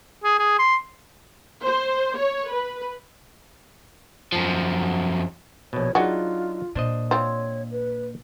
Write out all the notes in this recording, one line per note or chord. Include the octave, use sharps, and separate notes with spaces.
G#4
G#4
C6
C5
C#5
B4
F#2 F3
A#1 B2 C#5
F#3 D4 D#4 F4 F#4 G#4
A#2 D4 C5 D#5
C4 F4 C#5
B4